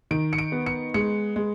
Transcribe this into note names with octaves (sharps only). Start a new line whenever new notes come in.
D#3 D7
C#7
D7
B3
C#7
G#3 C#7
G#3